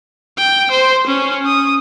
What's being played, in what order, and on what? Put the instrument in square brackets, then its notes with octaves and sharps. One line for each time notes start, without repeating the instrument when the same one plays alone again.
[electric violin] G5
C5
C#4
D#6